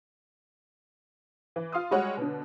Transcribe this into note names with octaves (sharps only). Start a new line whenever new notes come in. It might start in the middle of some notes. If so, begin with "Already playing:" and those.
E3
F4 F5 C6 D#6
G3 G#3 F#4 C#5 F#5
B2 D3